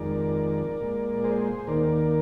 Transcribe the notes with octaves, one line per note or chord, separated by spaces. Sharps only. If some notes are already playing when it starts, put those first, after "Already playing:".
Already playing: F2 D#3 G#3 A#4 D5
A#2 G#3
G#4 C5
D#2 D#3 A#3 A#4 D5